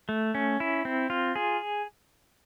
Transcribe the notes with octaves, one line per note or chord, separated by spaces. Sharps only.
A3
C#4
E4
C4
F4
G#4